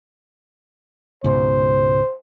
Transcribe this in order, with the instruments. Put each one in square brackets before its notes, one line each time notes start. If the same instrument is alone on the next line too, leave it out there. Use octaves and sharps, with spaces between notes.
[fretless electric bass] C#2 G#2 B2 [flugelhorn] C5